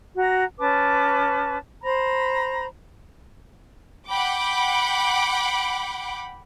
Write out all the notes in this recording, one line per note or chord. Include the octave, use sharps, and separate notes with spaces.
F#4 A#5
C#4 B4 A5 D6
C5 A#5 B5
F#5 G5 B5 D6